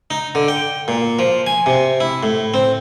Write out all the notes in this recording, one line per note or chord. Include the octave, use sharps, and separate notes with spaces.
D#4
D3
G5
A#2
F3
G#5
C3
E4
A2
C4